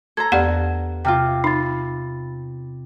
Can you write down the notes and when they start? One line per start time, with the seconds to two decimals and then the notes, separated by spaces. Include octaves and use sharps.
0.17 A4 C5 A#5 G#6
0.32 E2 B3 G4 D5 F#5
1.05 C3 F4 G5 F6
1.44 D#4 B5 A6